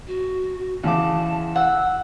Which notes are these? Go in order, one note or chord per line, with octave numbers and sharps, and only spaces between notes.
F#4
E2 C#3 A5 D6
F#5 E6